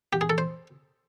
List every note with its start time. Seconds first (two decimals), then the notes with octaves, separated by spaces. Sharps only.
0.13 G4
0.21 G#4
0.30 A4
0.38 C5